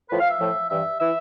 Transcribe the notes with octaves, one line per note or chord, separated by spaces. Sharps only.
A2 F3 B4
F5
E5
A2 F3
G2 E3 E5
E3 E5